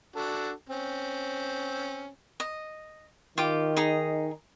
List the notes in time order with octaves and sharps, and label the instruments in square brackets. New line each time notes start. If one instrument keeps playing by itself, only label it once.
[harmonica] D4 F#4 A4
C4 C#4
[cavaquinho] D#5
[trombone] D#3 [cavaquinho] F4 G4 D6
[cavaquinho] D#4 G#4 A#5